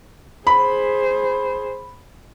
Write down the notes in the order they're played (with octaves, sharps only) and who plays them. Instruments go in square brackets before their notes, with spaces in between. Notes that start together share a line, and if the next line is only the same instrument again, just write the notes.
[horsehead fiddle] G#4 C5 [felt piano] B5